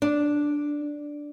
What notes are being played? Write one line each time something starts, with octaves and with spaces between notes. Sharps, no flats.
D4